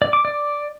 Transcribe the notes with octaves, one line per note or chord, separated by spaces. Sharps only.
D5
D6
D5